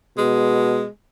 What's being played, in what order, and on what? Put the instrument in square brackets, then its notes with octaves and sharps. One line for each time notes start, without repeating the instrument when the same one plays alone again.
[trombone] B2 [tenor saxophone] G#3